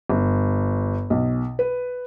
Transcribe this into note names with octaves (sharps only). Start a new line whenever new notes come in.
G1
B1
B4